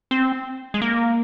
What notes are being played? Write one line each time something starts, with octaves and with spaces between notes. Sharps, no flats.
C4
G#3
A#3